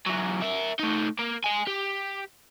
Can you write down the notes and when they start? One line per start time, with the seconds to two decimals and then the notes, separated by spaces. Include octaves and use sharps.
0.06 E3 F#3
0.43 A#4 E5
0.79 A3 D#4
1.19 A#3
1.44 D#5 G#5
1.67 G4